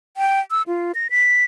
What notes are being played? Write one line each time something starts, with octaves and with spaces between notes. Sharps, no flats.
G5
E6
F4
A#6
B6